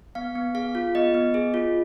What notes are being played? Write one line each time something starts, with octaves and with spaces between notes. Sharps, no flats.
B3 F5
B3
G#4 F5
F4
B3 D#5
B3
G#4
F4